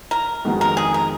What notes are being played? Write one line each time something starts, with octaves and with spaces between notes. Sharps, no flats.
A#4
F2 D#3 G#3 B3 F#4
A#4
G#4
A#4